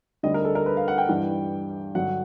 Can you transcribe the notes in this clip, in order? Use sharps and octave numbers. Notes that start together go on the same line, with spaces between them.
D2 D3 G3 D#5
A#4
A4
A#4
B4
F5
F#5
G5
G2 E3 G3
G2 D3 F#3 F#5